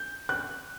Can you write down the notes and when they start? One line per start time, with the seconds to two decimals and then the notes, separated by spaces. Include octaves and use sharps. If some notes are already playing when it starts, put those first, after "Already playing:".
Already playing: G6
0.29 F#6